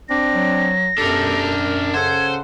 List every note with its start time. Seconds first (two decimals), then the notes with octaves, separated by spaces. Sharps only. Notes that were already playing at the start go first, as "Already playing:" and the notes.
0.09 C4 D4 A#6
0.35 F#3
0.98 F#2 B2 D4 G4 A4 A#4
1.94 C#3 A4 C5 F#5 G#6